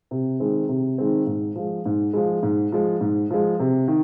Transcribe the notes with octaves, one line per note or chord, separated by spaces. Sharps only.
C3
D#3 G#3 C4
C3
D#3 G#3 C4
G#2
F3 G#3
G#2
F3 G#3
G#2
F3 G#3
G#2
F3 G#3
C3
D#3